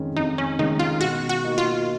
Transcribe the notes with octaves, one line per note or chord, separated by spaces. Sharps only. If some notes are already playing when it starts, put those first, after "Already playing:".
Already playing: F2 D#3 G#3 C#4
F2 D#4
C#4
D#3 G#3 C#4 D#4
F4
B2 F#4
F#4
A#3 D#4 F#4
F4